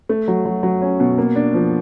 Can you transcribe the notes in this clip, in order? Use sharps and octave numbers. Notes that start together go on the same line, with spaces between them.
A3
F#3
F#3
F#3
C#4
B2
A#3
D4
F3